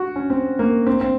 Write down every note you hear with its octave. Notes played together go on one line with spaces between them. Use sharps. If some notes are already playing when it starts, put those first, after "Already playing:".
Already playing: F#4
C#4
C4
A#3
C4
C4